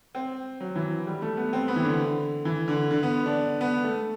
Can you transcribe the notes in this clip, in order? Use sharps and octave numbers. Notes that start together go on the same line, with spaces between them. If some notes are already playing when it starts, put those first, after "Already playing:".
C4
F#3
E3
G3
A3
B3
C4
B3
E3
D3
E3
D3
D3
B3
D4
B3
A3